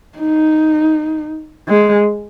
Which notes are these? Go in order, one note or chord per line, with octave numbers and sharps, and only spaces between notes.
D#4
G#3